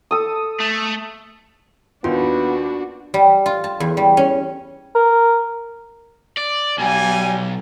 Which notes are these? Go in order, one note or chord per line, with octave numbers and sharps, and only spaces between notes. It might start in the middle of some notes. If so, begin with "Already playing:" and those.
A4 D#6
A3
D#2 B3 D4 D#4 F4 F#4 C6
G3
F4
A5
E2
G3
C#4
A#4
D5
B1 G3 G#5